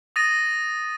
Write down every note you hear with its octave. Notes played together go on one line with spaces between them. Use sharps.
D#6 A6 A#6 D#7